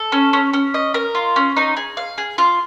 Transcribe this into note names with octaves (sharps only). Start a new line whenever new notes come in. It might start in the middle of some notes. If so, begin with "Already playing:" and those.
Already playing: A4
C#4
C#4
C#4
D#5
A#4
F4
C#4
D#4
G#4
F5
G#4
F4